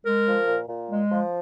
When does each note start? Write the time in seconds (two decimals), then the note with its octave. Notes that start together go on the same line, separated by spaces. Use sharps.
0.04 G#3 A#4
0.26 F3
0.47 A#2
0.68 A#2
0.90 G#3
1.11 F3